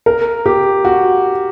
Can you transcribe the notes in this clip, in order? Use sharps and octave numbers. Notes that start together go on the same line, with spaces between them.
A#4
G4
F#4